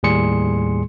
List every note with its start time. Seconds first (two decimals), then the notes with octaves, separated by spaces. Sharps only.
0.03 D#2 A2 G3 G#4 C6 C#7